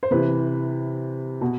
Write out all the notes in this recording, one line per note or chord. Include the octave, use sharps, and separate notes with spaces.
C5
C3 E3 B4
B2